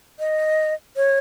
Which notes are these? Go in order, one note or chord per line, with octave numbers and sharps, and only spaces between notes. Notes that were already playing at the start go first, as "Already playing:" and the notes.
D#5
C#5